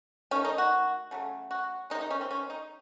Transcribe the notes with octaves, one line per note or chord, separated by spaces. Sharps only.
D#3 A3 C#4
D#4
F#4
C#3 F#3 A3
F#4
C3 D#3 G#3 D#4
D#4
C#4
C4
C#4
D#4